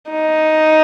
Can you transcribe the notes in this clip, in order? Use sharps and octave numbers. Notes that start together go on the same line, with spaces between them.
D#4